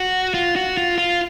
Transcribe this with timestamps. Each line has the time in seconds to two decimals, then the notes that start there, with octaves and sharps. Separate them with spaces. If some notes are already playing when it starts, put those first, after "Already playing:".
Already playing: F#4
0.34 F4
0.56 F#4
0.77 F4
0.98 F4